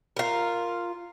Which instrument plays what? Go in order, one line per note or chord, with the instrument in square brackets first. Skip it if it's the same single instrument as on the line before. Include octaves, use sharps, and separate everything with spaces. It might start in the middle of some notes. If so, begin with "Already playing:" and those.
[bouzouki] F4 A#4